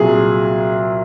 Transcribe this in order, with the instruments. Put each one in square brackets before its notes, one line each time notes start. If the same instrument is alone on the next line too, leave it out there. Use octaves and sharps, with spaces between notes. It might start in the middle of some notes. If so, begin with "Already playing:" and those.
Already playing: [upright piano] C2 A#2 F#3 [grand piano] G#4